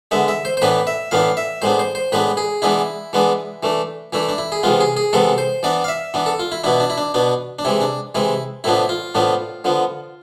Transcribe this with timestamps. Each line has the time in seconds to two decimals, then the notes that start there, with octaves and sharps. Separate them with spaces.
0.11 D3 G#3 B3 E5
0.28 E5
0.45 C5
0.57 C5
0.62 A2 E3 B3 D4 B4
0.87 E5
1.11 A2 E3 B3 D4 F5
1.37 E5
1.62 A2 G#3 B3 D4 C5
1.79 C5
1.95 C5
2.12 A2 G#3 B3 D4 B4
2.37 G#4
2.62 E3 G#3 B3 D4 E4
3.13 E3 G#3 B3 D4
3.63 E3 A3 D4
4.13 E3 A3 D4 E4
4.29 D4
4.38 E4
4.52 G#4
4.63 C3 E3 G#3 B3 F4
4.80 G#4
4.97 G#4
5.13 C3 E3 G#3 B3 A4
5.38 C5
5.63 E3 B3 D4 D5
5.84 F5
5.88 E5
6.14 E3 B3 D4
6.26 A4
6.39 F4
6.52 E4
6.64 B2 B3 D4 E4
6.80 D4
6.90 E4
6.97 D4
7.14 B2 B3 D4
7.59 D4
7.65 C3 E3 G#3 E4
7.81 D4
8.15 C3 E3 G#3 E4
8.64 A2 F3 B3 D4 E4
8.89 F4
9.15 A2 F3 B3 D4
9.64 D3 F3 B3